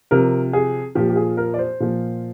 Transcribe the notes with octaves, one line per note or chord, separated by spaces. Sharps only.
C3 F3 A#4
G#4
A#2 F3 G4
G4
G#4
A#4
D5
C5
A#2 F3